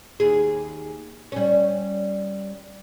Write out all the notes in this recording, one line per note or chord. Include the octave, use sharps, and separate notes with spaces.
D#2 G#4
G3 C#4